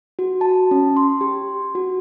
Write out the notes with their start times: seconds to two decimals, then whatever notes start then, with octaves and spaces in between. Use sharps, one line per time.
0.19 F#4
0.41 A5
0.71 C#4
0.97 C6
1.21 G4
1.75 F#4